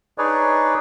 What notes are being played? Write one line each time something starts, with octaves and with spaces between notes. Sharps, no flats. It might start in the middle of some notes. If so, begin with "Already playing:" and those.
D4 D#4 G#4 B4 C#5 D5